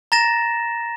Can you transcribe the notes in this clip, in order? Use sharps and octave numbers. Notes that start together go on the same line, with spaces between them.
A#5 A6 A#6 E7